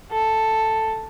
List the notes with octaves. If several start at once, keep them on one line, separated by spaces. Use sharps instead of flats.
A4